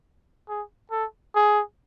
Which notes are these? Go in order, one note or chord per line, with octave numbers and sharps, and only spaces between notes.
G#4
A4
G#4